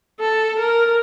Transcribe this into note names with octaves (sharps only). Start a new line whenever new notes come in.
A4
A#4